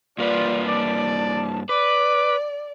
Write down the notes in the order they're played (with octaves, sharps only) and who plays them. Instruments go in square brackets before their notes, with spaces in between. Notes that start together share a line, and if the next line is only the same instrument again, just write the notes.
[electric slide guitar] G2 A#3 B4 [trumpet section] F4 [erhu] D5
[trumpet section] D5 [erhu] A5
[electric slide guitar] B4 [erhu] D5 [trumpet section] D6